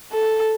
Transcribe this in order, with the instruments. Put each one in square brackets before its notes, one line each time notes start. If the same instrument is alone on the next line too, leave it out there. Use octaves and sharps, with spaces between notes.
[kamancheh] A4